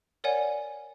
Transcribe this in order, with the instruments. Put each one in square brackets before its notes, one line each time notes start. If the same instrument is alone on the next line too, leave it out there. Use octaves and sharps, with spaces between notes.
[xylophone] A#4 C#5 D5 F#5 G#5